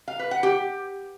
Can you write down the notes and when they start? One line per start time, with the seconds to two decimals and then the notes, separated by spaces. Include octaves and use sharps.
0.08 F5
0.19 B4
0.31 F#5
0.43 G4